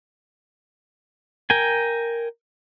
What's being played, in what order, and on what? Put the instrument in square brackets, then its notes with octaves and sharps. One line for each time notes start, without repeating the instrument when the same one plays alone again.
[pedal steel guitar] A#4 G5 G#5